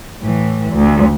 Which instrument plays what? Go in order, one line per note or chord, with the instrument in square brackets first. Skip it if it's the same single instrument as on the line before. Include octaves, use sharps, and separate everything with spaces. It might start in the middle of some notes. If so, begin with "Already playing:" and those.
[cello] A2 E3
D2